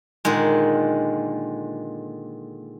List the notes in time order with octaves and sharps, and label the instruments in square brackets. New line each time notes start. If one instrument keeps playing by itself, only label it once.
[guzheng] A#2 D3 D#3 G#3